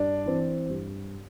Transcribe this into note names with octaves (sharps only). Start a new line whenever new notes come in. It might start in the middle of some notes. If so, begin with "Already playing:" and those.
Already playing: G2 D4 D5
E3 C4
G2